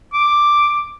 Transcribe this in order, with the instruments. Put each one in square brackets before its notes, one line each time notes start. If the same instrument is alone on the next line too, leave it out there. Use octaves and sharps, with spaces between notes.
[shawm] D6